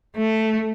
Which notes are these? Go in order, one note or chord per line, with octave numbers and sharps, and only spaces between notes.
A3